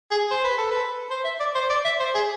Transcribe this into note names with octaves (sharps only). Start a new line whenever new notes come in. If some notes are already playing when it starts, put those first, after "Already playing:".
G#4
C5
B4
A4
B4
C5
E5
D5
C5
D5
E5
C5
G#4